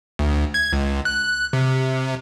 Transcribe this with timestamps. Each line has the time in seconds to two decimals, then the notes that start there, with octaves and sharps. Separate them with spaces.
0.19 D2
0.54 G#6
0.73 C#2
1.05 F#6
1.53 C3